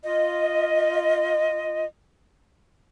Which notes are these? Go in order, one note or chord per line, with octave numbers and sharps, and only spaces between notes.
F4 D#5